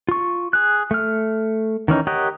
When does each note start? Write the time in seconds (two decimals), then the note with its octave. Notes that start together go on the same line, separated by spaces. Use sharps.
0.09 F4 C#6
0.53 G#4 F#6
0.91 A3 F6
1.88 D#3 E3 C#4 D#4
2.07 G4 A#4 C#5 D#5 F#5